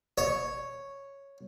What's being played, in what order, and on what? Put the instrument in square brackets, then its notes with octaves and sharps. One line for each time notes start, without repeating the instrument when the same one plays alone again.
[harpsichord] C#5